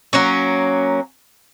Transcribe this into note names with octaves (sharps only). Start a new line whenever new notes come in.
F#3 A#3 C#4